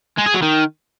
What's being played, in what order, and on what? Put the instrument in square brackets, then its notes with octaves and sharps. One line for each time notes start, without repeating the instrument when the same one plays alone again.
[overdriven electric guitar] G#3
G#4
F#3
D#3